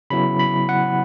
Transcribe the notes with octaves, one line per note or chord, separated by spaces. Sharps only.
C#3 F#3 B3 E4 B5
B5
F#5